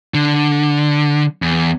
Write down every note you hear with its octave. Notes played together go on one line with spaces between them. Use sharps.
D3
E2